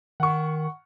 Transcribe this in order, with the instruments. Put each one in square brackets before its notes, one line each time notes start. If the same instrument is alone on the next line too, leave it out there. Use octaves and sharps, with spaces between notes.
[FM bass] D#3 [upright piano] F#5 C#6